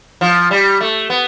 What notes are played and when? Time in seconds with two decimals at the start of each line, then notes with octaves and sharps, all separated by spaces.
0.21 F3
0.51 G3
0.81 A3
1.10 B3